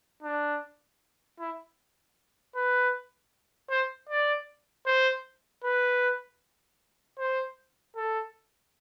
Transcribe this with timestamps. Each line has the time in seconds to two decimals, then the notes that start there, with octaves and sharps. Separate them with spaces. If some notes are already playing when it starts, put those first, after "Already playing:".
0.23 D4
1.39 E4
2.55 B4
3.70 C5
4.09 D5
4.86 C5
5.64 B4
7.19 C5
7.96 A4